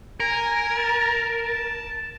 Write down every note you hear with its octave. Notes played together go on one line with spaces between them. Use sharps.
A#4 G#5
A5
A5